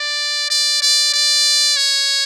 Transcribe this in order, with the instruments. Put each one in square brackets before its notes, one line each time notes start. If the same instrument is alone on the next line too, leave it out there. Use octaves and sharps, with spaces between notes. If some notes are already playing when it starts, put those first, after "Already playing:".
Already playing: [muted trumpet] D5
D5
D5
D5
C#5